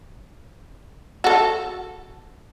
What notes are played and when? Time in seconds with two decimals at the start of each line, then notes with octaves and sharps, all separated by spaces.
1.24 F#4 A4